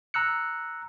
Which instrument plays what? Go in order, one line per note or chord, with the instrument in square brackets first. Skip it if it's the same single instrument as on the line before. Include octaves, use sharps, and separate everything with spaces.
[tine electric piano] A#5 E6 F#6 C#7